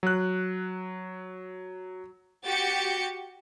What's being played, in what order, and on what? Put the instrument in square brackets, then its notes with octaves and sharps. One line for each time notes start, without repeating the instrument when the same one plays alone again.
[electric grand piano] F#3 F#6
[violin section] F#4 G4 G6 A6 C#7